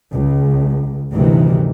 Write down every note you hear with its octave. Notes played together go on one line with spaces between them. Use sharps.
C#2
D2 G2 C3 D#3 E3